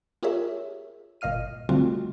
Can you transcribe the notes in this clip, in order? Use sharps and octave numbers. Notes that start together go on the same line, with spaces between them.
F4 G4 G#4 A#4 C#5 E5
G1 A#2 D#5 F5 F6 D#7
D3 G3 A3 C4 F4 F#4